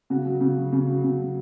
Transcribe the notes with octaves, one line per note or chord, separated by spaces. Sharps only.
C#3 F#4
F#3
C#3
F#3
C#3
F#3
C#3
F#3